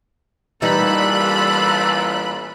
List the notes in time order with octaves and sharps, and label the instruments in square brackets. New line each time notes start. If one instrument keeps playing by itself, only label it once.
[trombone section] A1 A#2 [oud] E3 G3 D#4 [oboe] A4 [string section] B5 F#6